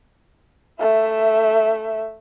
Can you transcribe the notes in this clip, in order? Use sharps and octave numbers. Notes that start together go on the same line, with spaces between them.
A3 E5